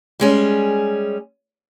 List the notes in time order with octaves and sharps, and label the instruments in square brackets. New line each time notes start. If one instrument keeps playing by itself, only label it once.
[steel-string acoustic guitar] G3 G#3 C#4